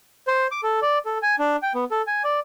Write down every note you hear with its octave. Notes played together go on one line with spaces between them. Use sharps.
C5
D6
A4
D5
A4
G#5
D4
G5
B3
A4
G#5
D5